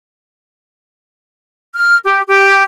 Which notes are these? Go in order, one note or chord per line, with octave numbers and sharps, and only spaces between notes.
F6
G4
G4